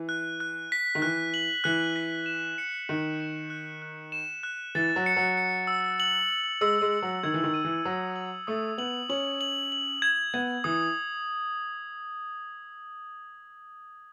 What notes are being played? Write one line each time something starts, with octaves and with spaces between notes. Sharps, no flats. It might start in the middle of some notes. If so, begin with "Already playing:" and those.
Already playing: E3
F#6
F#6
B6
D#3
E3 F#6
F#7
E3 F#6
B6
E7
C#7
D#3 F#6
E7
F#6
F#6
E7
F#6
E3 A6
F#3
C#7
F#3
C#7
E6
F#7
E6
G#3 E6
G#3
C#7
F#3
D#3 G#6
E3
D#3
D#7
E3
F#3 D#6
F#7
A3 D#6
B3 F#7
C#4 F#7
F#7
F#7
G#6
B3 G#6
E3 D#6